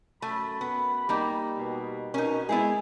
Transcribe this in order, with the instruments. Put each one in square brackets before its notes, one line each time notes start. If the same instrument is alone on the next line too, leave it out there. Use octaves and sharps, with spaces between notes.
[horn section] F#2 B5 [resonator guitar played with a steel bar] A3
[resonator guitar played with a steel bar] B3
[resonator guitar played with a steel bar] G3 A#3 D#4 [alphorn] G4
[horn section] B2
[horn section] B2 [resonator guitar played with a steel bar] C#4 D#4 [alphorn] A#4
[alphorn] G#3 [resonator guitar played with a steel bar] B3 E4 G#4